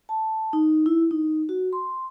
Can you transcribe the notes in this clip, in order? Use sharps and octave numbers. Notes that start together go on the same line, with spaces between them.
A5
D#4
E4
D#4
F#4
C6